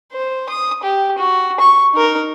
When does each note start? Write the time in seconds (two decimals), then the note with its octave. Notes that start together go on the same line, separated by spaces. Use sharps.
0.12 C5
0.49 D#6
0.83 G4
1.18 F#4
1.60 C#6
1.94 D#4 A#4